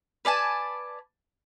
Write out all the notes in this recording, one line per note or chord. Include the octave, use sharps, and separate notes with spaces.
B4 D5 G#5 A5